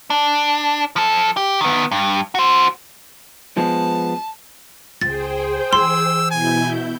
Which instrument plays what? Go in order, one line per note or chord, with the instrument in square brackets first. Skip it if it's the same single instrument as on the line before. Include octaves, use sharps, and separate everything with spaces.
[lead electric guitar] D4
F3 A4
G4
D#3 B3
G2
F#4 C5
[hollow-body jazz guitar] F3 G#3 B3 [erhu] A5
[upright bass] C#2 [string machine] G#4 C5 G5 [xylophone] A6
[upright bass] E3 [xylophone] C6 [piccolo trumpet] E6
[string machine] B2 E4 G6 [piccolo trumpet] G#5